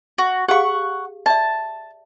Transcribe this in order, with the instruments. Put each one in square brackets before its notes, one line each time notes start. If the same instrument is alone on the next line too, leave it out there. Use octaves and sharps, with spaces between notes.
[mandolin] F#4
[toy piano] G4 G#4 F5 [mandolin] F#5 C#6
[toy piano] D5 E5 [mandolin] A5